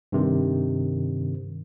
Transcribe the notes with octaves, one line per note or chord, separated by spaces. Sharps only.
G2 C3 D#3